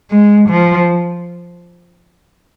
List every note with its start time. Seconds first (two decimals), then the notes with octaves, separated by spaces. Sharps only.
0.11 G#3
0.50 F3